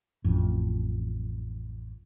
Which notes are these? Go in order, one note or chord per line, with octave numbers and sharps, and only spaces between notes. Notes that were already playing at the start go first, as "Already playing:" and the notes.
A1 F2